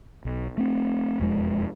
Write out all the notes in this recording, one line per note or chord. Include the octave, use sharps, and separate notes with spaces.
B1
A3 C4
E1 F2 G#3